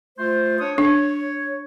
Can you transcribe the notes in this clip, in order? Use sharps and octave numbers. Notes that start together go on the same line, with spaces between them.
A3 F4 C5
D4 C#5 D#6
D4 C#5